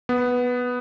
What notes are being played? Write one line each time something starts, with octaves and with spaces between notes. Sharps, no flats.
B3